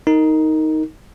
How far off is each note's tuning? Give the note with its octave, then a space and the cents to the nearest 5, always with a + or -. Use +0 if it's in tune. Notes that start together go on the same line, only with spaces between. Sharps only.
D#4 +10 A#4 -20